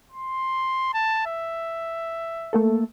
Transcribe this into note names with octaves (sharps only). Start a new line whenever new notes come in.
C6
A5
E5
A3 A#3 A4